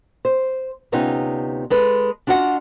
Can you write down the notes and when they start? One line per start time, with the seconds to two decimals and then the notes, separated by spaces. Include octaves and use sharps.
0.25 C5
0.92 D2 C3 B3 C#4 D#4 F4
1.70 G#3 A4 B4
2.27 D4 F4 F#4 D#5 F#5